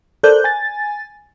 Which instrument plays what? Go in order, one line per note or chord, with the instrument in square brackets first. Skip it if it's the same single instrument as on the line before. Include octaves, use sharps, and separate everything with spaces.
[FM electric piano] A4 A#4 C5 D5 F#6 G6
G#5 A6